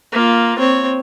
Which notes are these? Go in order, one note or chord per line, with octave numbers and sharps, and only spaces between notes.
A#3 F4
C4 C#5